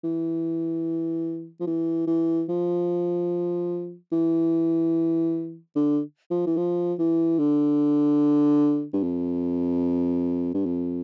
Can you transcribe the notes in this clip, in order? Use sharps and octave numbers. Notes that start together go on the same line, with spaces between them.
E3
F3
E3
E3
F3
E3
D3
F3
E3
F3
E3
D3
G2
F2
G2
F2